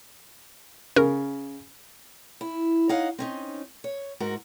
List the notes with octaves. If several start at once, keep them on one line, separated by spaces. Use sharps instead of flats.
C#3 A#4
E4
D#4 C#5 D#5 F5 F#5
C4 C#4 D#4
C#5
G#2 F#4 A#4